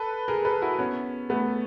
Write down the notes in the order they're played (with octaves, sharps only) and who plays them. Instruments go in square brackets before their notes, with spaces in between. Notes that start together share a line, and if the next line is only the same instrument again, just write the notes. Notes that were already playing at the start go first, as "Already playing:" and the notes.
Already playing: [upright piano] A4 B4
G#4 A#4
A4 B4
E4 F#4
B3 C#4
A3 B3